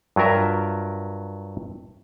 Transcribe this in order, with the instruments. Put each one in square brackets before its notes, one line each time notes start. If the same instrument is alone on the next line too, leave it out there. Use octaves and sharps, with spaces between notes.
[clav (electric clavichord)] G2 F#3 F4 A#4 E5